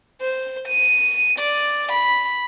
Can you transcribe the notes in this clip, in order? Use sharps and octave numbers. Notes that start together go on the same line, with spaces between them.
C5
D#7
D5
B5